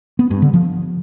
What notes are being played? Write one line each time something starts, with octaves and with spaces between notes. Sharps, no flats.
B3
G2
D3
F3